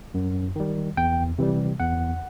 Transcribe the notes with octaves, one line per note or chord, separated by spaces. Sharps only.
F#2
D#3 G3
E2 G5
C3 E3 G3
E2 F#5